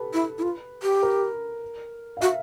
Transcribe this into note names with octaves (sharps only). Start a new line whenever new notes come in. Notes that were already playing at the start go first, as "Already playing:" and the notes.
Already playing: G4 A4 B4
E4
E4
F4
G4
A#4
F5
F#4 E5